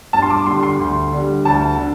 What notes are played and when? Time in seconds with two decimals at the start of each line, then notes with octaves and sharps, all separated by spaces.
0.13 G2 A5
0.22 C6
0.30 D6
0.46 D3 G3 C6
0.63 C6
0.80 D2
1.12 D3 G3
1.45 D2 A5
1.78 D3